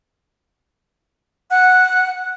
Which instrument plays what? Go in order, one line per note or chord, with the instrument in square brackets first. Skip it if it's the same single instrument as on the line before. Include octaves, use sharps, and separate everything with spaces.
[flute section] F#5 F#6